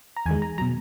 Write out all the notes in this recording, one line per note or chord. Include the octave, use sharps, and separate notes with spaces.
A#5
E2 D#3 G#3 G#5
A#5
B2 F#3 A#5